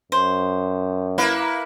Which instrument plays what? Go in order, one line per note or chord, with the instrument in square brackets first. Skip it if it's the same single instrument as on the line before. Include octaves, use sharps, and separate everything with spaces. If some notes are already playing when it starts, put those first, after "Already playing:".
[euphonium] F#2 [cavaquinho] C5
[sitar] A#3 E4 B4